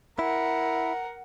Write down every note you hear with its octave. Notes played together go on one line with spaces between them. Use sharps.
E4 A#4 F#5